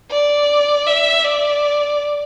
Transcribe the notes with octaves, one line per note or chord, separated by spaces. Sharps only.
D5
E5
D5